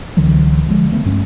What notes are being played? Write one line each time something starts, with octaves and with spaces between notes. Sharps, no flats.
C#2 D3 E3 F#3
D3 F3 G#3
C#3 F#3 A3 B3
G2 C#4